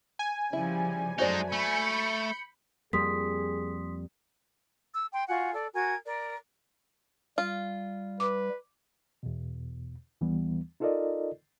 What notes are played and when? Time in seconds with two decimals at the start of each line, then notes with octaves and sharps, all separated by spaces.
0.19 G#5
0.53 C#3 F3 G3 E4
1.18 F#2 G#3 A3 D#4 F#4 C5 D5
1.52 A3 B5 G6 C#7
2.93 F2 G3 A#3 G#4 C6 D#6 B6
4.93 E6
5.13 G5 C6
5.28 F4 F#4 F#5 G#5
5.53 A4 D5
5.73 F#4 A#4 G#5 G#6
6.06 A#4 D5
7.38 G3 F4
8.20 B4 D6
9.23 E2 B2
10.21 D#2 E3 G3 B3
10.80 D#4 F4 A4 A#4 D5 D#5